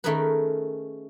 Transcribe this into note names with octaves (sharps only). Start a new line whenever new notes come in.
D#3 A3 C#4 G#4 A#4 B4